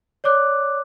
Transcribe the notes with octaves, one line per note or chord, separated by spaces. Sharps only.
C#5 D5 D6 F#6